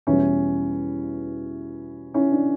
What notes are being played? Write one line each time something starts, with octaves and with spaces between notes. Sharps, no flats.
E2 B2 G3 C#4 E4
C#4 E4
D4